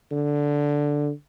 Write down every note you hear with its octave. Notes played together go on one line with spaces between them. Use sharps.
D3